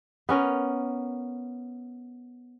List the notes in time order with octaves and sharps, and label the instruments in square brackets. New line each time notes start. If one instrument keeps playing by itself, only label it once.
[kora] B3 C#4 A#4